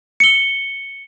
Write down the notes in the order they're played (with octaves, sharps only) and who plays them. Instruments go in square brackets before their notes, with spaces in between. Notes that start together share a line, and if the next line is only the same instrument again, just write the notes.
[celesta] C#7 G7